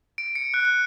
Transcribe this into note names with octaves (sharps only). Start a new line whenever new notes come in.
D7
C#7
F#6
F#6